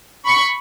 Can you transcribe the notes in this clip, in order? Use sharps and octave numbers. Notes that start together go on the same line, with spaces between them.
B5 C#6